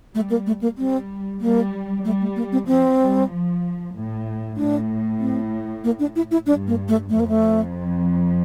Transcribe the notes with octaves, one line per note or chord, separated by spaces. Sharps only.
G3 A3
A#3
A3
A#3
G3 C4
G3 A#3
G3 A3
A3
A#3
C4
F3 C4
G3
F3
A2
A2 D4
C4
A#3
D4
E4
E4
G2 D4
A#3
A3
F2 A3
A#3
A3